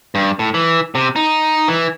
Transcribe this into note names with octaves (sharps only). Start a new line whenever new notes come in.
G2
A2
E3
C3
D#4
E3